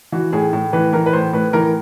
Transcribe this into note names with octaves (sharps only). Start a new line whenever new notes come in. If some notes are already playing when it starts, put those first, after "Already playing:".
E3 F#4
A2 G#4
A2
E3 B4
E3 A#4
B4
A2 C5
A2 B4
E3 A#4